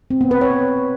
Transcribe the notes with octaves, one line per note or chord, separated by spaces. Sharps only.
C4
B3
B4
C#5